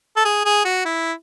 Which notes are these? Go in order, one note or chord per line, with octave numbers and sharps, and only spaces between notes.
A4
G#4
G#4
F#4
E4